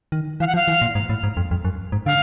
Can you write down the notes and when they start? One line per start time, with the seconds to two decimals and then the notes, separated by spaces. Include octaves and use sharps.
0.12 D#3
0.40 E3 F5
0.47 F#5
0.54 F3 F5
0.68 E3
0.82 A#2
0.95 G#2
1.10 A2
1.23 G#2
1.37 F2
1.51 F2
1.65 F#2
1.92 G#2
2.06 D3 F5